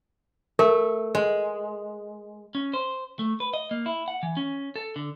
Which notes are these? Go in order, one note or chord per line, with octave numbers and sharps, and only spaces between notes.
A3 A#4
G#3
C#4
C5
A3
B4
D#5
A#3
E4
F#5
E3
C#4
A4
D3